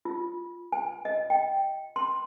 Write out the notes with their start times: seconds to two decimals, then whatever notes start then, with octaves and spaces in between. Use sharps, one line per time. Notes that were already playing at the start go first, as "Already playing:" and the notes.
0.05 F4
0.72 G#5
1.05 D#5
1.30 G5
1.96 C6